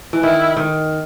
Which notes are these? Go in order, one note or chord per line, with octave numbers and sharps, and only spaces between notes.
E3
D#3 E4
D#3